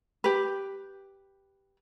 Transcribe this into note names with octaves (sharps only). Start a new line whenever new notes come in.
G4 B4